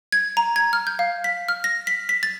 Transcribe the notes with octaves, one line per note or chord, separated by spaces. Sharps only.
G#6
A#5
G#6
F6
G6
F5
B6
F6
A#6
B6
B6
A6